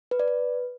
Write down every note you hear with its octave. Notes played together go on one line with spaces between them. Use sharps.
B4
D5
B4